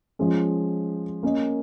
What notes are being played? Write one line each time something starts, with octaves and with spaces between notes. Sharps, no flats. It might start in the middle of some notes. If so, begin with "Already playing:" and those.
F3 G#3 C#4
A#3 C#4 A#4 D#5